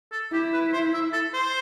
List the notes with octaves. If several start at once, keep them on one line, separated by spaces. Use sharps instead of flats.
A4
E4 G4
B4
C5
E5
A4
C5